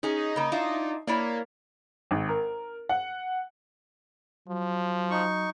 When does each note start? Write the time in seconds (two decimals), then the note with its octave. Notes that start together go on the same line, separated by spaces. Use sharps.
0.03 C#4 D#4 G#4
0.36 C#3 A#3
0.52 D4 E4 F4
1.07 A#3 E4 C#5 D5
2.11 G#1
2.29 A#4
2.89 F#5
4.48 F3 F#3
5.10 D#4 C#6